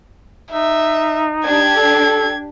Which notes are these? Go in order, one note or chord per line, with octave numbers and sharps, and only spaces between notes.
D#4 E5
D4 G4 G#6
A4